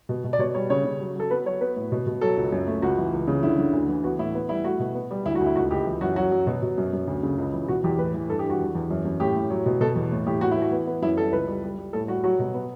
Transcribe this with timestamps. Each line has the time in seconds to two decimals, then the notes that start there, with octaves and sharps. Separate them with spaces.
0.09 B2
0.24 B2
0.33 D5
0.39 B2 C#5
0.55 G3 C#5
0.70 C#3 C#5
0.85 C#3
1.01 F#3
1.16 F#3 A4
1.31 B3 B4
1.46 F#3 C#5
1.61 B3 B4
1.76 A2
1.92 B2
2.07 B2
2.21 F#3 A4
2.37 C#2
2.52 F#2
2.67 A3
2.82 C#2 F#4
2.98 E3
3.13 C#2
3.28 C#3
3.43 D3 E4
3.59 D3
3.73 D2
3.89 E3
4.04 B3 F#4
4.19 A2 E4
4.35 B3
4.49 G3 E4
4.64 A3 F#4
4.80 B2
4.95 B3
5.11 G3
5.25 D2 E4
5.35 F#4
5.40 D2
5.46 E4
5.56 C#2 F#4
5.71 C#2 G4
5.87 E3
6.01 F#2 F#4
6.16 F#3 F#4
6.31 F#3
6.47 B2
6.63 B2
6.78 F#2
6.93 F#2
7.08 D2
7.23 C#3
7.38 C#2
7.54 E3
7.68 B2 F#4
7.84 E2 G4
7.99 A2 B4
8.14 E3
8.29 G2 A4
8.39 G4
8.45 G2
8.50 F#4
8.59 E2
8.75 E2
8.90 F#2
9.05 F#2
9.20 A2 G4
9.36 A2
9.50 F#3
9.66 B2
9.81 B2 A4
9.96 E2
10.12 A2
10.26 A2 G4
10.41 A2 F#4
10.51 E4
10.57 E3 F#4
10.72 B3
10.87 B3
11.02 F#2 E4
11.17 G3 A4
11.32 C#2 B4
11.48 G3
11.63 G3
11.78 G3
11.93 A2 A4
12.08 G3 F#4
12.24 F#3 F#4
12.39 B2
12.54 B3